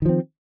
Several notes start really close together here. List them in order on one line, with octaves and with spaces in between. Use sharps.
D#3 F3 C4